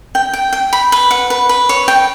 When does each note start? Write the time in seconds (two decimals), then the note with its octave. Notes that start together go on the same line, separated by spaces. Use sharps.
0.15 G5
0.33 G5
0.53 G5
0.73 B5
0.92 B4
1.11 F#5
1.30 B4
1.49 B4
1.69 C#5
1.88 G5